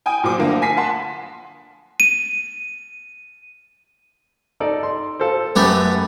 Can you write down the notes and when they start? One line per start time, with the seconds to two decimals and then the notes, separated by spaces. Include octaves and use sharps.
0.06 G5 G#5 D#6
0.24 A#2 F#3 C5 D6
0.38 D3 F3 A3 A#3
0.62 G#5 B6 C7
0.77 F#5 A5 C6
2.00 D#7
4.60 D#4 A4 D5
4.83 C6
5.20 F4 A4 C5
5.56 F#2 A3 B3 G4